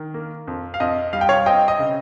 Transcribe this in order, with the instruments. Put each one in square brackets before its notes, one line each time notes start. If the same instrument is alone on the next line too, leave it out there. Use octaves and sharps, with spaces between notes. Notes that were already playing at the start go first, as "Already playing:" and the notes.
Already playing: [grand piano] D#3
A#3
F2
F5
F2 D#5
G3 F5
G5
C#5 F5
C4 D#5 G5
D#5
C#3